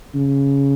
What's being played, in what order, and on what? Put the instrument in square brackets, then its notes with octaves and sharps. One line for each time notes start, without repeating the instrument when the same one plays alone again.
[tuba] C#3